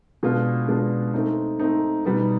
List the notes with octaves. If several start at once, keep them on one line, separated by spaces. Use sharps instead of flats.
B2 G#3 B3 D4 F4
B2 G#3 B3 D4 F4
A3 C4 D#4
A3 C4 D#4
B2 G3 B3 D#4